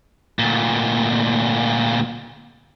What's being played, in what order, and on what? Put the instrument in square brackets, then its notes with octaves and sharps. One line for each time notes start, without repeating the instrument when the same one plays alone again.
[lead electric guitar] D2 A#2